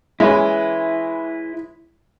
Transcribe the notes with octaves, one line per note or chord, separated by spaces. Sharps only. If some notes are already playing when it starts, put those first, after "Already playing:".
G#3 C#4 E4 B4